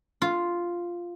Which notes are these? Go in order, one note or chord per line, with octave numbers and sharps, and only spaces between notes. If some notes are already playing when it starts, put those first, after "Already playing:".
F4